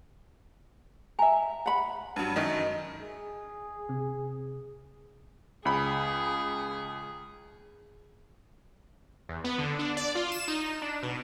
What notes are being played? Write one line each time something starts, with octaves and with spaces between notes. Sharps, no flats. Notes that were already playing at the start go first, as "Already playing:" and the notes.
E5 G#5 A#5
F#5 B5
G2 F#3
F#2 D#3 D#5
G#4
C3
C#2 G#4 B5
E2
B3
D3
D4
D5
F4
E7
D#4
D4
B2